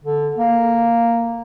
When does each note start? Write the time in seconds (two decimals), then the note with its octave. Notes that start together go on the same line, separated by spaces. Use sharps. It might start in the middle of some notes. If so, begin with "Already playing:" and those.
0.04 D3
0.38 A#3